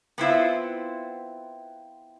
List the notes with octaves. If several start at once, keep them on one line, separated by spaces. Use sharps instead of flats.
B3 C4 E4 F4